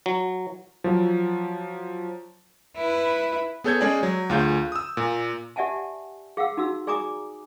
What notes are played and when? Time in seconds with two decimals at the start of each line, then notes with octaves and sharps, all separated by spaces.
0.06 F#3
0.84 F3 F#3
2.77 E4 B4
3.64 B3 G#4 A4 C#5 G6 G#6
3.81 G#3 C#4 G#4 D5 G#5
4.03 F#3
4.30 D2 F4 G#4 G6
4.72 D#6 E6
4.97 A#2
5.56 G4 D5 E5 F#5 G#5 A5
6.37 G#4 F5 F#5 E6
6.57 D#4 F#4 E6
6.87 G#4 D5 G#5 A#5 D6 D#6